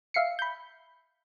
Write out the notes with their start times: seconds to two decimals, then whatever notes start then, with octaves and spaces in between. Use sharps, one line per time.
0.14 E5 F5 C7 C#7
0.39 B5 G6